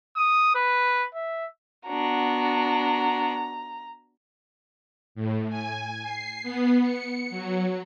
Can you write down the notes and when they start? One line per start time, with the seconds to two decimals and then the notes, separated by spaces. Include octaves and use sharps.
0.16 D#6
0.55 B4
1.15 E5
1.87 B3 D4 F#4 A#5
5.15 A2
5.49 G#5
6.03 C7
6.43 B3
6.82 C#7
7.30 F#3